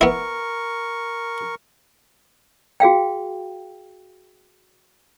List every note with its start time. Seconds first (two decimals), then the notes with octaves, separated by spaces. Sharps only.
0.01 B3 E4 A#4 C#6
2.80 F#4 G#4 F5 G5